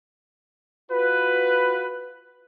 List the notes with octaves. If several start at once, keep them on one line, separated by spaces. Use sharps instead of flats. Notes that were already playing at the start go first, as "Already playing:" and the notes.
F4 F#4 B4